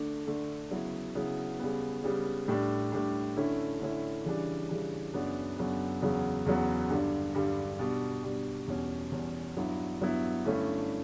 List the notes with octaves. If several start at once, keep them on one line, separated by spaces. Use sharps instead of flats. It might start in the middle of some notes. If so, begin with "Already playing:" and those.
Already playing: D3 A3 D4
D3 A3 D4
C#3 F#3 B3 E4
C#3 F#3 B3 E4
C#3 G3 B3
C#3 G3 B3
A2 G3 D4
A2 G3 D4
D3 A3 C#4 E4
D3 A3 C#4 E4
C#3 E3 G3 D4
C#3 E3 G3 D4
F#2 C#3 F#3 B3 D4
F#2 C#3 F#3 B3 D4
E2 C#3 F#3 B3
E2 C#3 F#3 B3
G2 D3 G3
G2 D3 G3
B2 G3 D4
B2 G3 D4
E2 B2 G3 C#4
E2 B2 G3 C#4
G2 F#3 B3 E4
G2 F#3 B3 E4
G2 D3 A3 C#4 E4